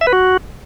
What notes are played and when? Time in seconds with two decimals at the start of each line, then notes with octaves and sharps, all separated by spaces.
0.01 E5
0.07 B4
0.13 F#4